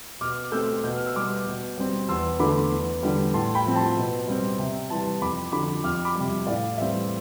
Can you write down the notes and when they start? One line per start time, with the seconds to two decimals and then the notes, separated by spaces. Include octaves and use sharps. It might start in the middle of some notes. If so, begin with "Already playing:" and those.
0.21 B2 D6 F6
0.52 A3 C4 E6 G6
0.84 B2 G6
0.95 F6
1.06 E6
1.15 G3 B3 D6 F6
1.46 B2
1.77 G3 C4
2.09 E2 C6 E6
2.39 D3 A3 B5 D6
2.71 E2
3.03 D3 G3
3.33 A2 A5 C6
3.55 G5 B5
3.65 F3 C4
3.76 A5 C6
3.97 B2
4.28 G3 C4
4.59 C3
4.90 E3 G3 A5 C6
5.22 F2 B5 D6
5.52 D3 F3 B5 D6
5.84 F2 D6 F6
6.05 B5 D6
6.15 C3 G3
6.47 A2 D5 F5
6.77 E3 G3 C4 E5